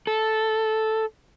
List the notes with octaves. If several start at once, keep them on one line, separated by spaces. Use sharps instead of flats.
A4